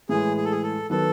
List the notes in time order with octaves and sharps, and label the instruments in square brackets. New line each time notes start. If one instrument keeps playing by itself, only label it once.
[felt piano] A2 E3 G#3 [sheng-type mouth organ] G#4
[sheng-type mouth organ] G#4
A4
G#4
A4
[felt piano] D#3 F#3 B3 [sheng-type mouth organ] A4